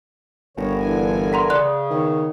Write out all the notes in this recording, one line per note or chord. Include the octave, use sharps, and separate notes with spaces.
G1 G2 D3 B3 A#4 C#5
D3 E3 G#5
F#5 A#5 C6
C#3 D5 C6 F#6
D#3 B3 C#5